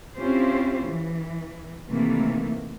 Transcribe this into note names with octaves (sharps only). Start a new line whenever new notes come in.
C4 C#4 E4 F4 G4 C5
E3
C3 D#3 E3 A3 A#3